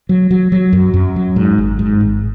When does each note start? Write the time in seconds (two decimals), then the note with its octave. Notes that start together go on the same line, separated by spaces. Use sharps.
0.09 F#3
0.31 F#3
0.52 F#3
0.73 F#2
0.94 F#2
1.16 F#3
1.36 G#2
1.58 G#1
1.79 G#2
2.01 G#1